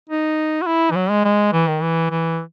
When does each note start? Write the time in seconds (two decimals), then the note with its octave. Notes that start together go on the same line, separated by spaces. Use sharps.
0.09 D#4
0.62 F#4
0.67 E4
0.91 E3
0.96 F#3
1.10 G#3
1.24 G#3
1.53 E3
1.68 D#3
1.82 E3
2.11 E3